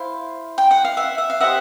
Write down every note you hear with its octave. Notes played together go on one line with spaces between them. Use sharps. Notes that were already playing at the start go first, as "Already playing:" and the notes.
Already playing: E4 C5 F5
G5
F#5
F5
E5 F#5
E5
F5
G4 C5 D#5 E5 F#5